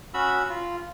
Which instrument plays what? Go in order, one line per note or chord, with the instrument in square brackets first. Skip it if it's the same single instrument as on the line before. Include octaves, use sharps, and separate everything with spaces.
[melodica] C#4 F#4 B5 E6
F4